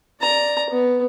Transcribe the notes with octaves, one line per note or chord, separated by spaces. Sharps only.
D5 A#5
B3